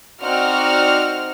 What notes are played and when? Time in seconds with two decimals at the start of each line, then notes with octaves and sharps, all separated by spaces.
0.22 C4 D#4 F#4 D5 F#5 F6